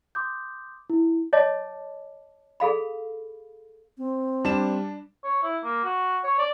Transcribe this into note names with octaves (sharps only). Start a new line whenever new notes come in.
C6 D6 D#6 G6
E4
C#5 D#5 A5 D6
G#4 A4 F5 B5
C4
G3 D4 E7
C#5
E4
A#3
F#4
C#5
D5